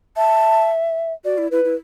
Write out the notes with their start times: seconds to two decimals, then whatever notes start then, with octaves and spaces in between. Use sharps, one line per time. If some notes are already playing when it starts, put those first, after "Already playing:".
0.16 E5 A5
1.25 F#4 D5
1.38 E4
1.51 E4 B4
1.65 E4